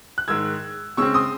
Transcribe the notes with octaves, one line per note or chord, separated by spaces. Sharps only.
F#6
G#2 D#3 G#3 E6 G#6
C#3 G#3 C4 C#6 E6
C6 D#6